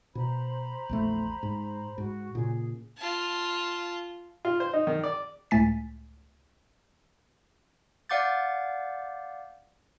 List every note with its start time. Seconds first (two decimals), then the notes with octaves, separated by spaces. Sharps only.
0.15 B2 C5 A#5 B5
0.89 A#1 E2 A3
1.43 G#2
1.98 G#2 F#4
2.35 A#2 C#3 G#4
2.97 F4 A5
4.45 F4
4.60 C5
4.73 D#4
4.87 D#3
5.04 D5
5.51 C#2 A2 A3 G#5 A6 B6
8.09 D5 F5 F#5 D6 G6 A6